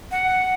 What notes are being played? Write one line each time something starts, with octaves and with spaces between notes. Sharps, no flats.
F#5